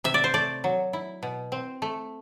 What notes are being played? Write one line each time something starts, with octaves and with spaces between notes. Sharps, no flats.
C3 E5
D5
C5
A3 D5
F#3
E4
B2
C4
A3